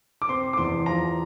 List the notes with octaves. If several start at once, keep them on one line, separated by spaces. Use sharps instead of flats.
D6
C4 C6
D6
E2 C6
F3 A#5